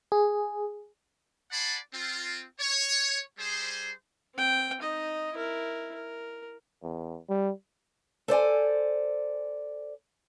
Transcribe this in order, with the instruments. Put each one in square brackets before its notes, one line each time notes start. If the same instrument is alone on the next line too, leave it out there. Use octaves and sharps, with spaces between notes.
[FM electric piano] G#4
[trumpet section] D5 F#5 G#5 A5 B5 C6
C4 F4
C#5
G3 G#4 C5
[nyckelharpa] C4 G5
D#4 D#5
E4 A#4
A#4
[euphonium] E2
G3
[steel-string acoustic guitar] A4 C5 D5 G#5